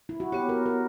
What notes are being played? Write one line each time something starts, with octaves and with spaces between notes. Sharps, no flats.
E4
F#4
B3 F#4 G4 C#5
A#4
A#4